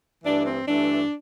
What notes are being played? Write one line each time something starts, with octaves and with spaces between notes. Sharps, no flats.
G2 E3 A3 D4
C4
G2 E3 A3 D4